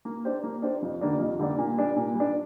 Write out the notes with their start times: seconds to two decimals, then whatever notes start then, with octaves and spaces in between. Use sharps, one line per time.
0.05 A#3
0.25 D4 G4 C5
0.43 A#3
0.62 D4 G4 C5
0.82 F2
1.01 D3 G3 A#3 D4
1.19 F2
1.39 D3 G3 A#3 D4
1.58 A#2
1.78 G3 D4
1.96 A#2
2.15 G3
2.20 D4